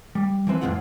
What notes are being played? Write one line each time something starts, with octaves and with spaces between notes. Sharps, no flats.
G3
E3 F3 C4 B4
F2 A2 E3 C4 F4 F#5